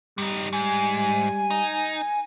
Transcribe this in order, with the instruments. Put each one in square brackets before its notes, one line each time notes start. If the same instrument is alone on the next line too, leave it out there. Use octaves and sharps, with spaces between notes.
[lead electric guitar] G2 D#4 [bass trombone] G3
[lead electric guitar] G#2 [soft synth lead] G#5
[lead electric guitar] D#4